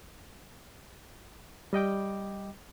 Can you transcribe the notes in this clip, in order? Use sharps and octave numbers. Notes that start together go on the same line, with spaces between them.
G3 D#5 G5 D6